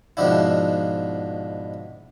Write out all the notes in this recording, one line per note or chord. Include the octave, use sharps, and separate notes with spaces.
G#2 B2 F3 D4 E4